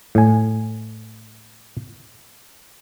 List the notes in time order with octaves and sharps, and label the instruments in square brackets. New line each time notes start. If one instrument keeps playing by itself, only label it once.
[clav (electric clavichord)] A2 G#5